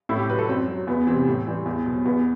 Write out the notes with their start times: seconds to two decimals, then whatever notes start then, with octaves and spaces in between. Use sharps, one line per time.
0.09 A2 E4
0.19 G4
0.30 F#3 B4
0.39 A4
0.49 F#2 C4
0.68 F#3
0.87 E2 B3
1.07 C3 E3 C4
1.27 A2
1.47 E3 G3
1.66 E2
1.86 B2 F#3
2.05 E2 B3